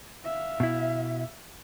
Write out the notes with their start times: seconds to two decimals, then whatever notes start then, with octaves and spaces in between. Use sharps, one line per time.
0.24 E5 F5
0.60 B2 E4